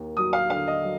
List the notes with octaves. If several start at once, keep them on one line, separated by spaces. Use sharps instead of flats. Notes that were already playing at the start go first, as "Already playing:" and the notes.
Already playing: D#2 A#3
F#3 D#6
F5
D3 F5
D#5
F#3